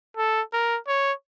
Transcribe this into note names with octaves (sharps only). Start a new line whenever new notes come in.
A4
A#4
C#5